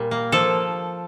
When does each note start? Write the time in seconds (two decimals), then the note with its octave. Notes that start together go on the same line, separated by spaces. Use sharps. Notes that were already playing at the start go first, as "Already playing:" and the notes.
Already playing: A#2 G3
0.11 A#3
0.32 F3 A4